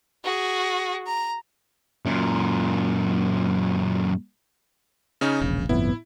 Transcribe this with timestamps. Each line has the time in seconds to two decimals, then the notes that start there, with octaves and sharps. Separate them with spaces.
0.24 F#4 G#4
1.07 A#5
2.05 F#2 A#2
5.21 C#3 C#4 D#4
5.41 E1 A#1 C#3
5.69 G1 F2 A2 B3 E4